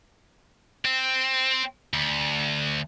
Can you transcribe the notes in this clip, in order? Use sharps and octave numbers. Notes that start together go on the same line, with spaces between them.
C4
D2